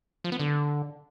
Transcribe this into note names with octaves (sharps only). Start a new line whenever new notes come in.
F3
B3
D3